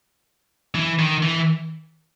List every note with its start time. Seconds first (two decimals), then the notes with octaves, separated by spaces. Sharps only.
0.75 E3
0.99 D#3
1.22 E3